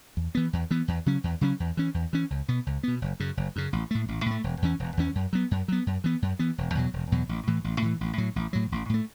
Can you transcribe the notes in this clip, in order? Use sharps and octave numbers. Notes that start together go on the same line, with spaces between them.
E2
E3 B3
E2
E3 B3
E2
C#3 F#3 C#4
E2
C#3 F#3 C#4
E2
E3 C#4
E2
E3 C#4
C#2
B2 B3
C#2
B2 B3
F#1
F#2 C#3
F#1
F#2 C#3
A1
A2 A3
A1
A2 A3
E1
E2 E3 C#4
E1
E2 E3 C#4
F#2
F#3 B3
F#2
F#3 B3
F#2
E3 B3
F#2
E3 B3
E1
E2 B2 F#3
E1
E2 B2 F#3
A1
A2 E3
A1
A2 E3
A1
A2 F#3
A1
A2 F#3
A1
A2 A3